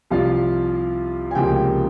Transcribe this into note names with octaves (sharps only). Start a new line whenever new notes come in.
C2 C3 F3 F4 F5
G#5
C#2 C3 F3 A#3 G4 G5